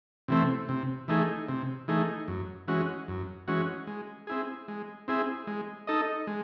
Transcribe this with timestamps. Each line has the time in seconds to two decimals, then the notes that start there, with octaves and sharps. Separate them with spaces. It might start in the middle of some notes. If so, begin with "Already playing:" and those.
0.28 C3 E3 A3 C4
0.69 C3
1.08 E3 A3 D#4 G#4
1.49 C3
1.88 E3 A3 D#4 G#4
2.28 F#2
2.68 E3 G#3 C#4 F#4
3.08 F#2
3.48 E3 G#3 C#4 F#4
3.87 G#3
4.27 C4 E4 G#4
4.68 G#3
5.08 C4 E4 G#4
5.47 G#3
5.87 D#4 A4 D#5
6.27 G#3